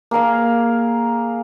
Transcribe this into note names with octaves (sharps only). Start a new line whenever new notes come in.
A#3 G#4 A#4 F5